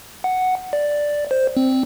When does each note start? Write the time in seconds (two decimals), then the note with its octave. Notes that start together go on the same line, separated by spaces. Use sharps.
0.24 F#5
0.73 D5
1.31 C5
1.57 C4